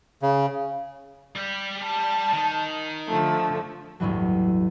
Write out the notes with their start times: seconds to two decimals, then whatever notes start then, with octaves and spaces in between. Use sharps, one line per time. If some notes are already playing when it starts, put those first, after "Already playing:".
0.22 C#3
1.36 G3 G4
1.84 A5
2.33 D#3 D#4
3.08 D3 F3 A3
4.00 A1 E2 G2 E3 F#3